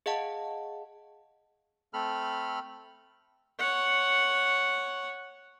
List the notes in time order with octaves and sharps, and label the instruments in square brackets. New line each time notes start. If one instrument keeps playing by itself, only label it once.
[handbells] G#4 D#5 F5 F#5 A5
[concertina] A3 C4 A4 B5 F6
[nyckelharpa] C#5 F#5